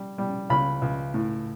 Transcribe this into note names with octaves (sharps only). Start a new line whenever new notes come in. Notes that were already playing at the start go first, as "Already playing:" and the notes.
Already playing: G3
G3
C#2 B5
C#2
A2